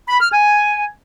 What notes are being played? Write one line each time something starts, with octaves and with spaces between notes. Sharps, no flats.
B5
F6
G#5